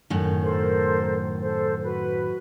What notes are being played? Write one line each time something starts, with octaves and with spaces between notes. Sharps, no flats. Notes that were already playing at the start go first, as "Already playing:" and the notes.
F#2 A2 D#3
A4 A#4 C5
A4 C5
F#4 B4